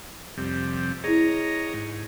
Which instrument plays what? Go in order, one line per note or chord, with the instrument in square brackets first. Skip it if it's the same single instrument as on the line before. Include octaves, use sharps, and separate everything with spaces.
[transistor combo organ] F2 C3 G3
[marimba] E4 G#4 [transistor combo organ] C#5 D#5 A#5
[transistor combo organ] G#2